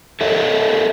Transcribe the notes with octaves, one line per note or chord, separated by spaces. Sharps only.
A4 A#4 C#5 D#5 E5